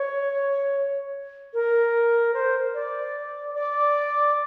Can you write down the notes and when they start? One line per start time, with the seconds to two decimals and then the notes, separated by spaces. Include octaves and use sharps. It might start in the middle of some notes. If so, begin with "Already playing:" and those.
Already playing: C#5
1.54 A#4
2.34 C5
2.74 D5
3.55 D5